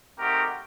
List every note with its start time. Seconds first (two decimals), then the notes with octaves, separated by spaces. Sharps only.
0.18 A3 C4 D#4 F#4 G4 A#4